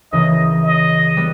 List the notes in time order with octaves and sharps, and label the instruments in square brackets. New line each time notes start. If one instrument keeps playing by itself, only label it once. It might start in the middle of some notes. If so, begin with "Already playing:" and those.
[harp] C#2 C#3 E3 A#3 [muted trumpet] D#5
[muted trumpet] D#5
[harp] G3 B3